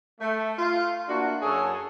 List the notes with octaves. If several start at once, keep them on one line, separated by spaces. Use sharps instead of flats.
A3
F4
A#3 D4 E4 F#4
F#2 F#3 C#4 G#4 A4 C#5